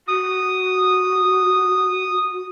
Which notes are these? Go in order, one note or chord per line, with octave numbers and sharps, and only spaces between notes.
F#4 D#6